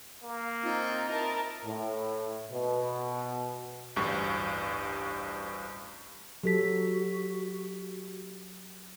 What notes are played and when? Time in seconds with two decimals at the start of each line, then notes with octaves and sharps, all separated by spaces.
0.23 A#3
0.64 C4 D#4 F4
1.08 E4 A#4 D#5 A5
1.65 A2
2.51 B2
3.96 A1 D2 G2 C#6
6.44 F#3 F#4 G4 A4 B6